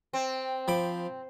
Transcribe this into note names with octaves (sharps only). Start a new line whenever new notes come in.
C4
F3 B5 D6